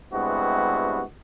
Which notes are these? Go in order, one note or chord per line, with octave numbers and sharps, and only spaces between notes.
G2 C3 G#3 B3 E4 F#4